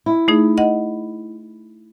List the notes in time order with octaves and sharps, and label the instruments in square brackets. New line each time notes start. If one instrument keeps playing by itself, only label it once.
[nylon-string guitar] E4
[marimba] A3 D#4 G#4
D#5 F#5